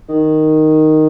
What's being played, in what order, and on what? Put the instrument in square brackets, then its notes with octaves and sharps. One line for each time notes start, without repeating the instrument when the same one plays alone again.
[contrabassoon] D#3